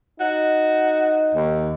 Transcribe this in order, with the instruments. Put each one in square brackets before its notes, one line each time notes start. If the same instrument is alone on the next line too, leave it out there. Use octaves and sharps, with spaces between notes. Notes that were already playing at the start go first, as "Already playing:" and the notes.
[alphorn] D#4 [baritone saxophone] F#4
[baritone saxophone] D#2